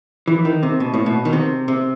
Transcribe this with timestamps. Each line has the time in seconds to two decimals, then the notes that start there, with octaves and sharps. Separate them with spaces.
0.28 E3
0.45 D#3
0.63 C3
0.80 B2
0.94 A2
1.06 B2
1.25 D#3
1.33 C3
1.68 C3